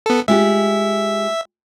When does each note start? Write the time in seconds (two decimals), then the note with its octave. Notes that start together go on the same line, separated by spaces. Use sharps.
0.06 B3 A4
0.28 G#3 F4 G4 E5